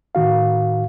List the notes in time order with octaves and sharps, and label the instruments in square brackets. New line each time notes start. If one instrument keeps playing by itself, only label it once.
[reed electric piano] A2 D#3 F#4 F5